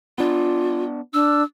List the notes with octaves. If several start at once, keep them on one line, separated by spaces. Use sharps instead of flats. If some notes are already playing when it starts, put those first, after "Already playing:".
B3 D4 F4
D4 E6